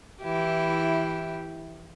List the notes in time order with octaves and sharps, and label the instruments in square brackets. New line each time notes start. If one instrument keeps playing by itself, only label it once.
[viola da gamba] E3 E4 G4